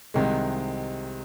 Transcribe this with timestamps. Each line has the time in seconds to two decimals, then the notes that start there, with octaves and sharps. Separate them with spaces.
0.14 C2 C3 D#3 G#3